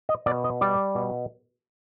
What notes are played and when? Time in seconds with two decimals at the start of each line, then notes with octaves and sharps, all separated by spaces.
0.09 D#5
0.26 B2 D5
0.44 D#5
0.61 G3 D5
0.95 B2